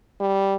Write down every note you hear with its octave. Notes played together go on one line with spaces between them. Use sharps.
G3